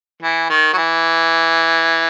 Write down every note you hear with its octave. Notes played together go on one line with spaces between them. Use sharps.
E3
D#3
F#3
E3